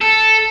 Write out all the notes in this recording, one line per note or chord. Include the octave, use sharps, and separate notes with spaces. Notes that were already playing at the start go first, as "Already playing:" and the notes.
A4